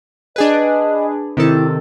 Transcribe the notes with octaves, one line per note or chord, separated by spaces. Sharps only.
D4 G#4 B4 D#5
C3 D#3 E4 A4